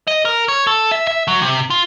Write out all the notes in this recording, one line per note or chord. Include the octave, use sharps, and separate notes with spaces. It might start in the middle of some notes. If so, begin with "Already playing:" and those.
D#5
A#4
C#5
A4
E5
E5
F#3
C3
F4